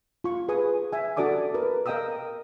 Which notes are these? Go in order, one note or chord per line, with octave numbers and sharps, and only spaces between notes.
F4 C#6
G#4 B4 G#5 D#6
E5 G#5
D4 F#4 A4 D5 D6 D#6
A#4 B4
A#4 D#5 F5 G5 D#6 E6